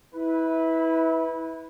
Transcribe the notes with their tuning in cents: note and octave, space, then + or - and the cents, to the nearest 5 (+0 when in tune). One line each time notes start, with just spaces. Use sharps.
E4 -25 B4 +0